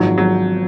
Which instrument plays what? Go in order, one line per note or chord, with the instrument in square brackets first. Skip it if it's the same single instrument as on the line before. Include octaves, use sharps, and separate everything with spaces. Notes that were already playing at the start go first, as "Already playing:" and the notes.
Already playing: [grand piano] G#1 G#2 F3 [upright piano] F#3
[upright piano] F#3